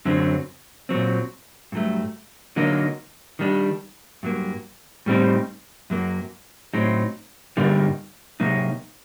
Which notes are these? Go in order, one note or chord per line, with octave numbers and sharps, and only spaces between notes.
F#2 D3 F#3 C4
A#2 F#3 C4
G2 F#3 A3
D3 F#3 A#3 D#4
D#3 G3 D4
G2 F#3 A#3
A2 G3 C4 D#4
F#2 F#3 A#3
A2 F#3 C4 D#4
G2 D3 G3 A#3 D#4
C3 F#3 A#3 D#4